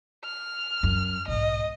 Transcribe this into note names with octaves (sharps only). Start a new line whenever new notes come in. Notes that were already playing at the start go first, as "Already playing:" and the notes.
F6
F#2
B1 G#2 D#5